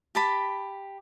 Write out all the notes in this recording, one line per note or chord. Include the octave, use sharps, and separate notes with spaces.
G4 A5 B5